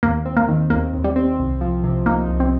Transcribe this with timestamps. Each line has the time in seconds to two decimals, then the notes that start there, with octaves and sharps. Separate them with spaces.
0.03 D#2 A#3
0.25 C4
0.37 A#3
0.48 D#3
0.70 D#2 A#3
0.94 D#2
1.04 G3
1.16 C4
1.39 C2
1.61 F3
1.84 C3
2.06 A#3 D#4
2.29 C2
2.40 C4